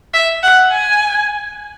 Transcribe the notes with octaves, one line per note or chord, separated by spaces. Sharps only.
E5
F#5
G#5